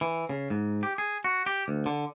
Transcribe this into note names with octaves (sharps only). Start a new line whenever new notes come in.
E3
C#3
G#2
G4
G#4
F#4
G4
D2
D3